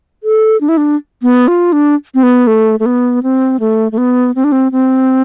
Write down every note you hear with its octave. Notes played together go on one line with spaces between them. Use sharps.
A4
D4
E4
D4
B3
F4
D4
C4
B3
A3
A3
B3
C4
A3
A3
B3
C4
D4
C4
C4